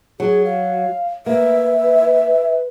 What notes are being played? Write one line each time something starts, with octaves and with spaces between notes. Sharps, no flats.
F#3 G#4
F5
A#3 B4 E5